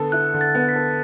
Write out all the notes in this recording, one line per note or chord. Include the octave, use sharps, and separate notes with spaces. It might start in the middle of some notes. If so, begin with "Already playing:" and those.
Already playing: D3 B3 A4
E4 F#6
D3
A6
B3
B6
A4